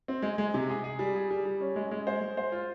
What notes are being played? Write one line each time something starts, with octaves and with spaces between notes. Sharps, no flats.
C4
G#3
G#3
C3
G#4
G#4
G3
G#4
G3
G3
C#4
G#3
G#3
C5
G#3
C5
F4